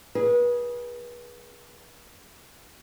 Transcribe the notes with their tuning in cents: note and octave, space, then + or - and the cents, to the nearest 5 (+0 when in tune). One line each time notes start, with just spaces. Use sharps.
G#4 +0 B4 -35